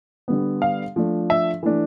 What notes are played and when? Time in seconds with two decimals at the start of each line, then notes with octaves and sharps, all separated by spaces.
0.28 D3 G3 B3
0.62 F5
0.96 F3 A3 D4
1.30 E5
1.63 E3 A3 D4